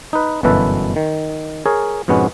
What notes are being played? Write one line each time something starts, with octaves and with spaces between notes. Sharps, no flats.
D#4 B4
G1 F#2 B2 E3 A4 B4
D#3
G#4 A#4 C#5
F2 G#2 B2 B3 C#4